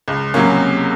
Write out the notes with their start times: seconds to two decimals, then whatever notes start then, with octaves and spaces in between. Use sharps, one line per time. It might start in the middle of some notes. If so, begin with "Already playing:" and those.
0.08 C#2
0.34 C3 F#3 A#3 C#4